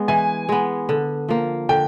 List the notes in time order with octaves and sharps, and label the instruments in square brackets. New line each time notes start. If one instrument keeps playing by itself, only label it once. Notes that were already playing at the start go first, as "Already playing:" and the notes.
Already playing: [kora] G#3 B3
[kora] E3 [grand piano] G#5
[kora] G#3 B3
D3
F3 A#3
[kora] D3 [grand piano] G5